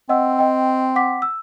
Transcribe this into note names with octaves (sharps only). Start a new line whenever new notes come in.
C4 D#5 F#5 E6
D#5 G5
F#5 D6 B6
E6